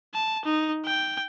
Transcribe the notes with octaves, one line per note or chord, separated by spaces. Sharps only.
A5
D#4
G5